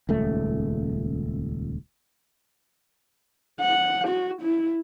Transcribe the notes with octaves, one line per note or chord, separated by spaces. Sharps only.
D#1 C#2 A3
F#5
F#4
E4